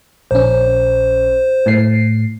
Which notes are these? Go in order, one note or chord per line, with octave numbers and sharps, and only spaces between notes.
A#1 C#4 C5
A2 C7